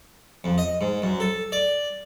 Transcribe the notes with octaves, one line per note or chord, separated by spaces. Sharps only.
F2
D#5
G#2
F#2
A4
D5